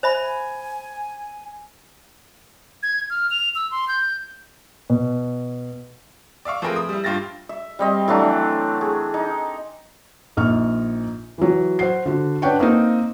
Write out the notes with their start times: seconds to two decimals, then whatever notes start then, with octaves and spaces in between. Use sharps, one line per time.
0.03 C5 E5 G#5 B5
2.83 G#6
3.10 F6
3.31 F7
3.55 E6
3.71 C6
3.88 G6
4.90 B2
6.45 D5 E5 F5 C#6
6.62 F3 A3 C4 G#4 A#4 B4
6.76 D#6
6.89 G3 E4
7.04 G2 F4 G4 A6 A#6
7.49 E5
7.79 G3 C4 D#5
8.08 E3 F#3 A3 D4
8.81 G#4
9.14 D#4
10.37 A#1 D#4 C#6 F6
11.38 E3 F#3
11.79 C5 F#5 C7
12.06 D3 F#4
12.42 D4 B4 C#5 F#5 G5 C#6
12.60 A#3 C4 D#4